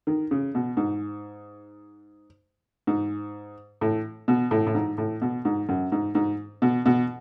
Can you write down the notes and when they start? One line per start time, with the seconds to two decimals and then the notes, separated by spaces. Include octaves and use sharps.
0.07 D#3
0.31 C#3
0.55 B2
0.77 G#2
2.87 G#2
3.81 A2
4.28 B2
4.51 A2
4.67 A2
4.75 G#2
4.98 A2
5.22 B2
5.45 G#2
5.69 F#2
5.92 G#2
6.15 G#2
6.62 B2
6.86 B2